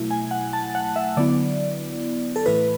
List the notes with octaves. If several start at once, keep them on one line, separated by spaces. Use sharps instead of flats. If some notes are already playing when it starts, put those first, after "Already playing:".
Already playing: B2 F#3 A3 E4
G#5
F#5
A5
F#5
E5
D3 F#3 B3 E4 D5
A4
A2 E3 A3 E4 B4